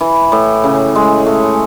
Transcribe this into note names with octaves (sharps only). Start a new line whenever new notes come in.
E3
A2
C#3
G#3
A3